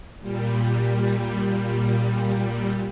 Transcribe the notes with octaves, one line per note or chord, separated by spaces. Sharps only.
A#2 G3